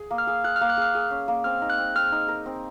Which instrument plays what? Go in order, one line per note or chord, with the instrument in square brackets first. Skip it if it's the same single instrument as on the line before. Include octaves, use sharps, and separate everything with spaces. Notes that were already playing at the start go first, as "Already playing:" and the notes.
Already playing: [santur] G#4
A#3
[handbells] F6
[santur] G#4
[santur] G#4 [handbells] F#6
[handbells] F6
[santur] A#3
[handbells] F#6
[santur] G#4 [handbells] F6
[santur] G#4
C#4
A#3
[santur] C4 [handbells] F6
[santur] D#4
[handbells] F#6
[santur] C4
[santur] C4 [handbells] F6
[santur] D#4
A#4
C4